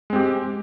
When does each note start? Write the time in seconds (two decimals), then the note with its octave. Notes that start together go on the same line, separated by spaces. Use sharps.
0.10 G#3
0.13 C4
0.16 G4